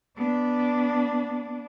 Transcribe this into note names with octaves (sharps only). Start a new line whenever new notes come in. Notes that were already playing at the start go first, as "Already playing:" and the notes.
B3 D4